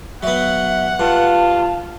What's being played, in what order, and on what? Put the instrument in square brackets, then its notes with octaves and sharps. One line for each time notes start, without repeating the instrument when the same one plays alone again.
[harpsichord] F#3 B3 [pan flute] E5 [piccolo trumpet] F#5
[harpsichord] G2 [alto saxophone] F4 [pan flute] A5